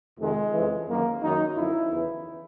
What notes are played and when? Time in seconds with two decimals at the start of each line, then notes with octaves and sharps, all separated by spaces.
0.19 F2 C3 D#3 G#3
0.53 F2 C#3 E3
0.88 F#2 D#3 F#3 A#3
1.22 F#2 D#3 F#3 D#4
1.56 F#2 D3 F3 E4
1.91 E2 C#3 E3